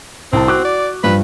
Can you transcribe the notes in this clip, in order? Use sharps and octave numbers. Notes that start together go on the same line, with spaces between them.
C2 C4 A5
F#4 D6 F#6
D5
G2 F3 B4